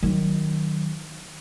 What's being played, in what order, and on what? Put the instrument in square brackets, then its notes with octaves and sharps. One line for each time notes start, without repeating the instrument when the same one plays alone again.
[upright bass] D#3 F#3